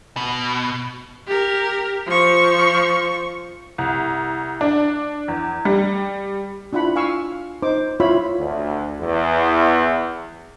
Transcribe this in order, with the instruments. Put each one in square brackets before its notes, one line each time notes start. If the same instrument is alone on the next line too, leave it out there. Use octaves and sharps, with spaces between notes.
[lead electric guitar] B2
[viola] G4 A#4
F3 C#6
[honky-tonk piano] C2
D4
E2
G3
[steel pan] D4 E4 F4 F#5 B5
F5 G#5 C#6 E6
D#4 C5 D6
E4 F4 C#5 E5 B5
[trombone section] D2
E2